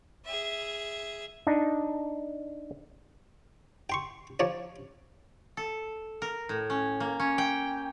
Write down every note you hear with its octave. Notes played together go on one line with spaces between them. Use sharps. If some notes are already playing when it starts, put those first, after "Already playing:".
G#4 E5
D4 D#4
G5 C6 C#6
F3 C#5 D5
A4
A#4
A2
C#4
A#3
C#4
G5